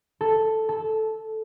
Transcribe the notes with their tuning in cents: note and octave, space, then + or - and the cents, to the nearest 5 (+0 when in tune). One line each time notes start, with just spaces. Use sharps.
A4 +0
A4 -10